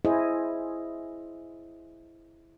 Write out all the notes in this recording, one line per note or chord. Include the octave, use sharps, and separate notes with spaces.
E4 G#4 C5 D#5